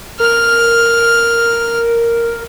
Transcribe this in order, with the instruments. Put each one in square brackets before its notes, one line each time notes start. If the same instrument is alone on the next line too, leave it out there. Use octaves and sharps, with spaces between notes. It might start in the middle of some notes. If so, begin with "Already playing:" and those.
[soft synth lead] A#4 [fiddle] F6